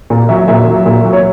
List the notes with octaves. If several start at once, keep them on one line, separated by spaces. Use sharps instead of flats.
A#2
F#3 E5
A#2 E5
F#3
A#2
F#3
C#5